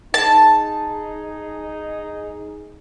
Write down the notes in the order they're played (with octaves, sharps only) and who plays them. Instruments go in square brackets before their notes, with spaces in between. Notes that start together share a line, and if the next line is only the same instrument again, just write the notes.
[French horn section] D#4 G#4 [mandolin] A5